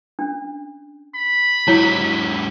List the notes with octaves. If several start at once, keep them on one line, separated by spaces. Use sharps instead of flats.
C#4 D4
B5
G#2 F#3 E4 C#5 A#5